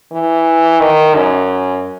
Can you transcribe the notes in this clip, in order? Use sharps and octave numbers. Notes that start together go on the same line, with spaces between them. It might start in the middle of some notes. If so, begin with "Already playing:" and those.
E3
D#3
F#2